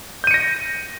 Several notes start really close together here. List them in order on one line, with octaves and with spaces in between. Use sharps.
G6 D#7 C#7 A#6